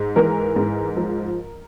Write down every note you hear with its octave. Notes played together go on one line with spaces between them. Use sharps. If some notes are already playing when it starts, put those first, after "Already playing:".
Already playing: G#2
E3 A#4
G#2
F3